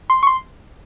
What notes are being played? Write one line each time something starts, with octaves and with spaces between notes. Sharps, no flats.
C6
C#6
C6